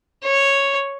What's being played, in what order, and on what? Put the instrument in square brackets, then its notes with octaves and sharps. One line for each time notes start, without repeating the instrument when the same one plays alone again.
[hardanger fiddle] C#5